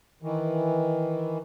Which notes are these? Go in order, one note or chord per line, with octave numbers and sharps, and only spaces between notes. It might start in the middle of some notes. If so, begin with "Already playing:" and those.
D#3 E3